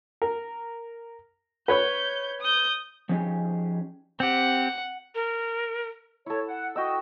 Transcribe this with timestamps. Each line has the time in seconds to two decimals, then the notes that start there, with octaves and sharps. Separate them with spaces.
0.22 A#4
1.68 B4 C#5 B5 G6
2.41 D#6 G6
3.09 F3 F#3 C#4 D#4 G4 G#4
4.20 C4 G4 F#5
5.15 A#4
6.26 E4 A4 C#5
6.48 F#5
6.76 F#4 D#5 G5 E6